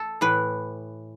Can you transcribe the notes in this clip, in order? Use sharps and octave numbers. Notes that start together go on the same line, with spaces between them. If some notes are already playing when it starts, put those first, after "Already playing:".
Already playing: A4
A2 E3 B4